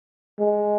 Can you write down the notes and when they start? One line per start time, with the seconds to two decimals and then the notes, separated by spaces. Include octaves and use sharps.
0.39 G#3